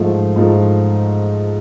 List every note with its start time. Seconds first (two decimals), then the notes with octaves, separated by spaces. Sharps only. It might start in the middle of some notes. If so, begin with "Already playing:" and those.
Already playing: G#2 F3 A3
0.36 G#2 F3 A3